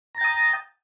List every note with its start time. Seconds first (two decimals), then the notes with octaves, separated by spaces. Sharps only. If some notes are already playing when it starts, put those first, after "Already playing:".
0.15 A#5
0.18 A6
0.21 G5
0.24 D#6